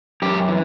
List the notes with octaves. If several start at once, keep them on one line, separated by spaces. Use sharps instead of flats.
F#2 G4
E3